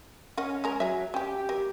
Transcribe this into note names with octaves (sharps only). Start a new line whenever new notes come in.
C#4 A#4 D#5 F#5
G#3 A#4 A#5
F#3 G#4 E5
C#4 G4 G5
F#3 A#4